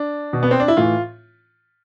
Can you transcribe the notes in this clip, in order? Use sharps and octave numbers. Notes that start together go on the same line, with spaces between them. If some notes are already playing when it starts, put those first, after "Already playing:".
Already playing: D4
B2
B3
C4
D4
E4
A2 E3 F4